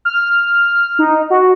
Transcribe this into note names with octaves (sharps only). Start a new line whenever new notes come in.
F6
D#4
F#4